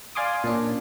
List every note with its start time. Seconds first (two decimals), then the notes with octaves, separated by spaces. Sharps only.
0.15 D5 F5 G#5 C6 D6 D#6
0.44 A#2 C#4 D4